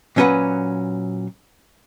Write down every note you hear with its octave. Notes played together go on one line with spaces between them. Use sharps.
A#2 F#3 C#4 F#4 B4 F#5